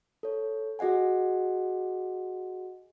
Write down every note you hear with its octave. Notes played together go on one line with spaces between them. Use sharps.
A4 C#5
F#4 G#4 D#5 F#5 G#5